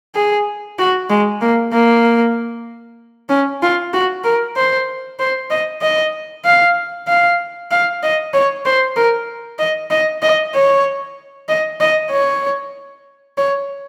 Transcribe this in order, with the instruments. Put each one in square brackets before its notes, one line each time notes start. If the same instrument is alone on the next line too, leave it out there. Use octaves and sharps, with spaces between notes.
[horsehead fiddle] G#4
F#4
G#3
A#3
A#3
C#4
F4
F#4
A#4
C5
C5
D#5
D#5
F5
F5
F5
D#5
C#5
C5
A#4
D#5
D#5
D#5
C#5
D#5
D#5
C#5
C#5